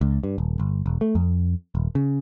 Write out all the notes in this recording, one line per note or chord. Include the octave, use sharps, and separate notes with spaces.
C#2
G2
D#1
G1
E1
A3
F2
D#1
C#3